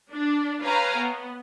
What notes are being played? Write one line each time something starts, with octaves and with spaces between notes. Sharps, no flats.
D4
B4 C#5 F5 G5 G#5 A#5
B3